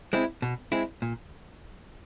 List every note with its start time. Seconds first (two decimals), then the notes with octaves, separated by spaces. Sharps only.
0.13 G#3 C4 E4
0.42 B2
0.72 G#3 C4 E4
1.02 A#2